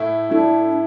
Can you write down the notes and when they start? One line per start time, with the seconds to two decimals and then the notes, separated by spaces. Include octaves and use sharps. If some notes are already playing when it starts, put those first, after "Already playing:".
Already playing: A2 A3 E4
0.29 A2 A3 D4 E4